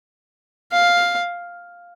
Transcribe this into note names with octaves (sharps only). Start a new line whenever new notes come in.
F5